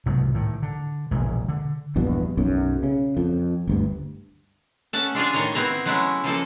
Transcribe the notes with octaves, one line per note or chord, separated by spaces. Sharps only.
C2 G#2 B2 F#3
A2 D#3
D3
E1 A#1 G#3
D3
A#1 E2 G2 B2
B1 F#2
C#3
F2
G1 D2 G2
A3 C#4 F#5 A5
G#3 D4 F4 G#4
A2 D#3 C#5 A#5
B3 C4 E4 A#5
F#3 G#3 A3 C#4 E4
C#3 F3 A#3 A4